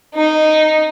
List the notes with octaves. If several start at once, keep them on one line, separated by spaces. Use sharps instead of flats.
D#4